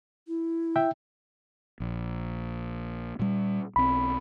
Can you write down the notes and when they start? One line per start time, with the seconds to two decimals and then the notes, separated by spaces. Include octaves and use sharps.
0.27 E4
0.76 E5 G5
1.80 A#1
3.19 A#2 G3
3.76 B1 C4 B5